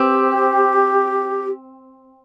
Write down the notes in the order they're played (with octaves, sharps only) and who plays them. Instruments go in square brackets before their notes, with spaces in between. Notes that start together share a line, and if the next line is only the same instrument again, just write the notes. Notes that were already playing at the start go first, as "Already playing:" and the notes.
Already playing: [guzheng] C4 [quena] G4